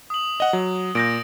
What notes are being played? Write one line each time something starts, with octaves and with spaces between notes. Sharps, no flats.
D#6 F#7
D#5 F#5 G7
F#3
A#2 G6 A#6 D7